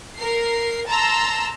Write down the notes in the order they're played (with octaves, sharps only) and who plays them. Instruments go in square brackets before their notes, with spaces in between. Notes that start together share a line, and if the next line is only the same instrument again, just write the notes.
[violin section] A#4 C7
A5 A#5 C6 E6